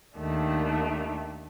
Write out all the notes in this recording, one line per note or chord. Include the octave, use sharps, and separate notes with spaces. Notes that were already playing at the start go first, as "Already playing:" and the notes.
D#2 D#3 A3 D4